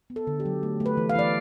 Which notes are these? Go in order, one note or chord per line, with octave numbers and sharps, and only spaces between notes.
B3
A4
D3
G4
F#3
A3
A3
B4
E3
F5
E3 D5